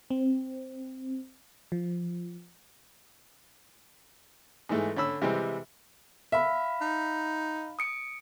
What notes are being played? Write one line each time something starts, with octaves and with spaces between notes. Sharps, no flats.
C4
F3
G#2 E3 G#3 A3
D3 C#4 B5 E6
C3 E3 G3 G#3 C4
E5 F5 B5
D#4
D#6 C#7 D7